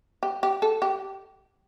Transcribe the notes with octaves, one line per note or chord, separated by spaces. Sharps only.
G4
G4
A4
G4